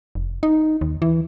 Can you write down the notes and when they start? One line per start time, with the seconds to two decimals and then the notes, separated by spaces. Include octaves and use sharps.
0.15 F1
0.43 D#4
0.81 D#2
1.02 E3